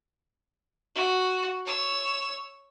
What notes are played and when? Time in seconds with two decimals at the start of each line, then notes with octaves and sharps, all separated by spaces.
0.95 F#4
1.66 C#5 E6